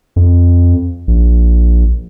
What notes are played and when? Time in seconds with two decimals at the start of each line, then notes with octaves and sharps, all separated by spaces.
0.16 F2
1.07 A#1